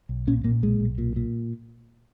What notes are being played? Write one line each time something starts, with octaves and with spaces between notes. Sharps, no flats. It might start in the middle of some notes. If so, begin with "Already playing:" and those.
B1
A#2 C#4
A#2 A#3
B1 G#3
B1
A#2
A#2